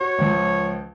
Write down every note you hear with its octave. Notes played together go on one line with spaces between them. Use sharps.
F#4 C#5
C#2 F3